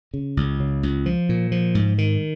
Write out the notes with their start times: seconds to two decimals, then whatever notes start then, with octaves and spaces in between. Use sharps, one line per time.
0.14 C#3
0.37 C#2
0.60 C#3
0.83 C#2
1.06 F3
1.29 A#2
1.52 F3
1.75 G#2
1.98 D#3